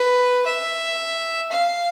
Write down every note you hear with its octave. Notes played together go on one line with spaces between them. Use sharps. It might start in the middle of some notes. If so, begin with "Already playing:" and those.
Already playing: B4
E5
F5